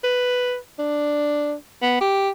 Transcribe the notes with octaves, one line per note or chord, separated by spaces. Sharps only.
B4
D4
B3
G4